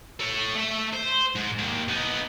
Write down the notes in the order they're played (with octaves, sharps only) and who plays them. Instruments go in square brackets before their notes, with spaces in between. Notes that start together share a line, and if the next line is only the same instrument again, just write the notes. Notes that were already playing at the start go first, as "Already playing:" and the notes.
[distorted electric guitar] A4 C#5
A3 E5
C5
G#2
D#2
B3 D#4